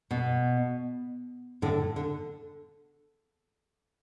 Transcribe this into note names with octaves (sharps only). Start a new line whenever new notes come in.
B2
A2 D3
D3